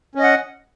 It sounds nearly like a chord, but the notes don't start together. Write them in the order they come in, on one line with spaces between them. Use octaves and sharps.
C#4 D#5 F#5